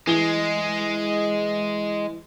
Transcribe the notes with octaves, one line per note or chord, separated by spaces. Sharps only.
E3 G#3 G7